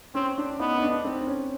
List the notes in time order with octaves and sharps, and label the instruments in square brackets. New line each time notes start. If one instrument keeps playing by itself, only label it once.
[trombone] C4 [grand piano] C#4
[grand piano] D4
[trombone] B3 [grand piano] D#4
[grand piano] D#4
D4
C4
C#4